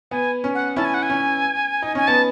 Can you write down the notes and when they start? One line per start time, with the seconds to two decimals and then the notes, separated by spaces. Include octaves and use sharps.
0.11 B3 G#5
0.44 C#4
0.55 F#5
0.76 C#4 E4 A5
0.85 G#5
0.94 F#5
1.03 G#5
1.10 C#4
1.82 D#4
1.95 C#4 G#5
2.07 B3 A5